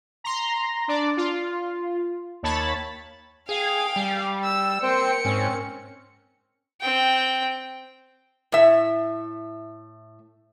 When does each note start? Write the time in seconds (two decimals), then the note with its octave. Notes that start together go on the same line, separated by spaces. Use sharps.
0.24 A#5 C6
0.88 D4 D5
1.17 F4
2.43 D#2 C#5 A5 B5 A6
3.49 G#4 F5 G5
3.96 G3
4.44 E6
4.83 A#3 C4 C5 G5 C#7
5.25 G#2 C4 C#4
6.81 C4 G5
8.52 A2 E5